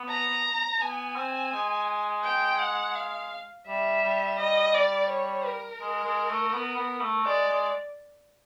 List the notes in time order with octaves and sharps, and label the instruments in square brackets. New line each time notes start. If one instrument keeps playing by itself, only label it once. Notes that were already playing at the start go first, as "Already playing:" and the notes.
Already playing: [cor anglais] B3
[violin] A#5
[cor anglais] B3 [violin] G#5
[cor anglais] C4
G#3
[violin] G5
F#5
F5
[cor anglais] G3 [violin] E5
[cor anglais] G3
[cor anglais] G3 [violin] D#5
[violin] D5
C#5
A#4
[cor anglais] G#3
G#3
A3
B3
B3
A3
[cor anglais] G#3 [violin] D5
[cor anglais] G#3